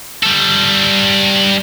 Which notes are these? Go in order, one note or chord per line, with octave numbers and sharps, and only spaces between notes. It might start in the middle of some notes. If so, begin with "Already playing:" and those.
G3 A4